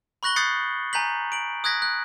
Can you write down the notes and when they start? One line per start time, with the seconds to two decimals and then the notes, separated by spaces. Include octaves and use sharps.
0.23 B5 C#6 F#6 A#6 F#7 G7
0.36 D#6 F#6 G6 A6 C7 C#7
0.93 G#5 A#5 G6 B6 F#7
1.32 D7 F#7
1.64 D#6 F#6 G#6 A#6 B6
1.82 F#6